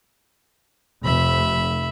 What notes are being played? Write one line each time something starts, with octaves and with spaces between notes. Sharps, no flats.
F1 E5 B5